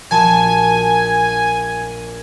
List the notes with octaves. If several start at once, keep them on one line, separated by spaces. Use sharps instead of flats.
A#1 F#4 G#5 A5